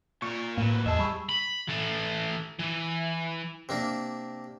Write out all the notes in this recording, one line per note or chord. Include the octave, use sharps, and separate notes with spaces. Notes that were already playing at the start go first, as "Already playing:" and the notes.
A#2 A#4 C#6
A2 E3 F#3 A#3
E2 G#4 D#5 E5 A5
G3 B5 C#6 E6
B5
E3 A4
E3
C3 A#3 D4